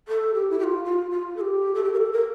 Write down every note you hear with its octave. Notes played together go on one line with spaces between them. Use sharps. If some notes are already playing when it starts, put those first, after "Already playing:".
A4
G4
E4
G4
F4
F4
F4
A4
G4
A4
G4
A#4
A4
A#4